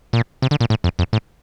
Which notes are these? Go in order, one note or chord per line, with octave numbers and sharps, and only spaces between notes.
A#2
C3
D3
A#2
A2
F2
F2
A2